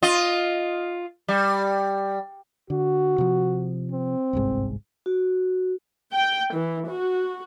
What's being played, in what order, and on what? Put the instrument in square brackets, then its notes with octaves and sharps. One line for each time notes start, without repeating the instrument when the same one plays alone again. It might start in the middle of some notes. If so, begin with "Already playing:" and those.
[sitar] F4 D#5
G3
[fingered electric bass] D3 [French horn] F#4
[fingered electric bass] C3 F3
[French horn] C4
[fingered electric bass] G1 C2 G#2
[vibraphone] F#4
[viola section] G5
E3
F#4